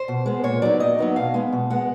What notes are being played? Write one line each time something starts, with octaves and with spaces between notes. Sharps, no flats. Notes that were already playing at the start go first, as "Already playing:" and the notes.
Already playing: C5
B2
G#3 B3
A#2 C#5
F#3 B3 D#4 D5
A#2 D#5
F#3 B3 D#4
B2 F5
G#3 B3
B2
G#3 B3 F#5